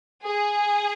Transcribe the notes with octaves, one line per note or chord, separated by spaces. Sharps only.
G#4